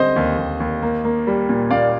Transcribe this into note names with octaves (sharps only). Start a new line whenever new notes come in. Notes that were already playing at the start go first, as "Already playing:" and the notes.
Already playing: D3 G3 C4 C5 D#5
D#2
D#2
D#2
A#3
A#3
G3
A#2
A#2 D5 F5